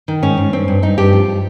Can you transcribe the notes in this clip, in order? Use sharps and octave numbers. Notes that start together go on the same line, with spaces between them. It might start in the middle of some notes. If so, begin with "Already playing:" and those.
D#3
G#2 C#4
G#2
G2 C4
G2
G2 D#4
G2 G4
F3